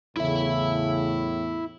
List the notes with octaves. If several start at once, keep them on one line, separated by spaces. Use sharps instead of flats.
E2 A2 C#3 E4 E5